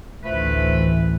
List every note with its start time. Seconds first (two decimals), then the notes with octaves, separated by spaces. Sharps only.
0.24 A1 D2 E3 F3 A3 B4